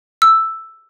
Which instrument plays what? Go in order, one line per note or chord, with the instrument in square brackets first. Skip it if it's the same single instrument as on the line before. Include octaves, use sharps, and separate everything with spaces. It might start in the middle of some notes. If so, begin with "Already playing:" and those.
[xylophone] E6